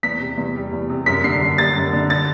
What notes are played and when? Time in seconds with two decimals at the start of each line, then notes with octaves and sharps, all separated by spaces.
0.03 E2 B6
0.20 C3
0.37 E2
0.55 G3
0.72 E2
0.90 C3
1.06 F#2 B6
1.24 D3 C7
1.41 F#2
1.58 G3 A6
1.76 F#2
1.93 D3
2.10 A6